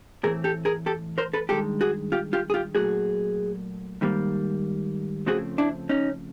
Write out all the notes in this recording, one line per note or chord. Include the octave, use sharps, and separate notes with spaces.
A2 E3 A3 C4 G#4 A#4
G4 A4
G#4 A#4
G4 A4
A#4 C5
A4 B4
G2 D#3 G#3 G4 A4
F#4 G#4
F4 G4
F4 G4
G#4
F4 G4
A#2 F#3 A3 F#4 G#4
G#2 D#3 G3 A#3
C#3 F3 A3 C4 F#4 G#4
D4 E4
C#4 D#4